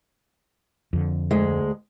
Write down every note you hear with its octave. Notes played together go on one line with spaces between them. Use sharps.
F2 D3
D2 G#3